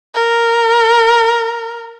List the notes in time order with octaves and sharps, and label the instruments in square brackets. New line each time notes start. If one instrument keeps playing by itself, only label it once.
[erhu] A#4